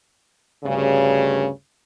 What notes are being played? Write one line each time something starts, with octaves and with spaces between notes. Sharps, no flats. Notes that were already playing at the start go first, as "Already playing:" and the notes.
D2 G2 C#3